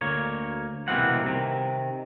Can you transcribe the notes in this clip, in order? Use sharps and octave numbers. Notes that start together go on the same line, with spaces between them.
D2 A#3 C#5
C2 B2 E3 A#3 C4 F#5
C3 D#3